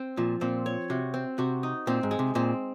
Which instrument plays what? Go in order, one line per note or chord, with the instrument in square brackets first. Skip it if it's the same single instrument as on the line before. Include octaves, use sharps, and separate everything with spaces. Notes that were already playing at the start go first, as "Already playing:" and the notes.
Already playing: [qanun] C4
[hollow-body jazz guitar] A#2 [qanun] F3
[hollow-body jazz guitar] A#2 [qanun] C4
[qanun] C#5
[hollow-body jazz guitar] C3 [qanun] F#4
[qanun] C4
[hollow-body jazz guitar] C3 [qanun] F#4
[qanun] D#4
[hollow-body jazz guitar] A#2 [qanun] C4
[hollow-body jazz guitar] G#2
[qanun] G#3
[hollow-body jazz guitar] C3
[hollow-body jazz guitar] A#2 [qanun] C4